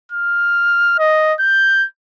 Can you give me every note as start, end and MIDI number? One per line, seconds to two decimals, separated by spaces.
0.12 0.97 89
0.99 1.34 75
1.40 1.85 91